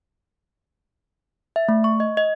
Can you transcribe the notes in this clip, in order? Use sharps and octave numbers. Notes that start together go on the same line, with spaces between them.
E5
A3
C#6
D#5
D#5